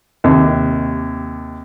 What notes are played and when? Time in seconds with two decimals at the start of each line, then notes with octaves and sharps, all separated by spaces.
0.24 D#2 C3